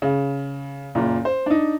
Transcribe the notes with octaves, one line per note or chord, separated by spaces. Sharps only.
C#3
F#1 A#2
C5
D4 D#4